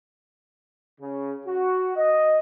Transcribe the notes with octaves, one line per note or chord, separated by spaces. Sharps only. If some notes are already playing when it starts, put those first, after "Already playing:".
C#3
F#4
D#5